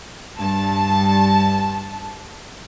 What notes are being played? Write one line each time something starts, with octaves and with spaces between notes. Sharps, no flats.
G2 A5